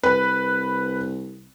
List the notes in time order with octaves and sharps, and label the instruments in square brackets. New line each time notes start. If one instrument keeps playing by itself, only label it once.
[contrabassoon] C2 [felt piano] B4